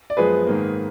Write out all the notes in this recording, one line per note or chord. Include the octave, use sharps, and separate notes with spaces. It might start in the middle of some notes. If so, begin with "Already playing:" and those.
D5
F#2 F3 G#3 B3 G#4 B4
G#2 D#3 A#3